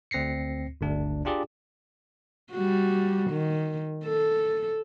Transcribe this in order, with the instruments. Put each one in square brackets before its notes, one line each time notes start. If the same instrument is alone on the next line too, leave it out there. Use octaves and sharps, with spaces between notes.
[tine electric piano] D2 C4 A#6 C7 C#7
G1 D2 D4
D4 F4 G4 G#4 D5
[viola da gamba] G3 F#4
D#3
A4